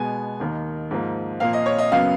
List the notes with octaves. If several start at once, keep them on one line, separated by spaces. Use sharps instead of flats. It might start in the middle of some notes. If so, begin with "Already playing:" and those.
Already playing: B2 G#3 B3 G#5
D#2 D#3 A#3
G#2 F3 A#3
A#2 F3 A#3 F5
D#5
C#5
D#5
F#2 C#3 F#3 B3 F5